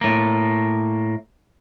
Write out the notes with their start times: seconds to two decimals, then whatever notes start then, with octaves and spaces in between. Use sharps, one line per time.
0.01 A2 A#3